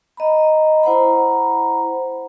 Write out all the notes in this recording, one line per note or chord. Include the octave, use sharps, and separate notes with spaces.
D#5 A#5 B5
E4 C5 F#5 A#5 B5